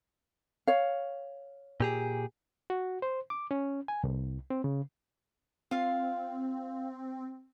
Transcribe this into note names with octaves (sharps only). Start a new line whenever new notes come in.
C#5 F5
A#2 G4 G#4
F#4
C5
D6
C#4
G#5
C2
C4
C#3
C4 F4 F5